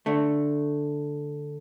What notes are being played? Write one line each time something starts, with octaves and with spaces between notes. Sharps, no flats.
D3 A3